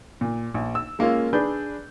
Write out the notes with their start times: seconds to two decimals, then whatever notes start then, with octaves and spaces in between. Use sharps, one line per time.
0.21 A#2
0.54 A#1
0.75 E6
0.99 G#3 A#3 C#4 F4
1.33 D4 G#4 B4 G6